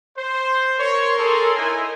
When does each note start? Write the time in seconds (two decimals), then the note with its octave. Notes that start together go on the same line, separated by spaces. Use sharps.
0.18 C5
0.79 A#4 C#5 C6
1.19 G#4 A4
1.57 D#4 E4 G#5